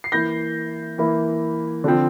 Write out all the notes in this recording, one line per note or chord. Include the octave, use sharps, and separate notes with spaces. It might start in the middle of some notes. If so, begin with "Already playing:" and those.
C7
E3 A#3 E4 G6 A#6
E3 A#3 E4
D3 F3 C4